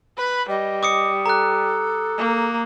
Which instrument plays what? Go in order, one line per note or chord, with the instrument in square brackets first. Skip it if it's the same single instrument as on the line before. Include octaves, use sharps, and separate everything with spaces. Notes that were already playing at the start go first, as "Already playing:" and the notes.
[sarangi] B4 [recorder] B5
[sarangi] G3 [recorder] D#5
[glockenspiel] D6 D#6 C#7
[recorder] A4 [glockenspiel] A#5 F#6
[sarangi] A#3